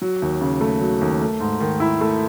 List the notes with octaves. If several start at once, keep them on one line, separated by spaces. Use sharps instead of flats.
F#3
D#2
C#3
A3
F#3
D#2
A3
G#2
D#3
E4
A3